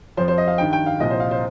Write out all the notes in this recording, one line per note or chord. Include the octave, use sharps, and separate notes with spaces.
F2 F3 C5
C5
D#5
F5
G2 D#3 G5
G5
F5
C2 A#2 F3 D#5
C5
F5
C5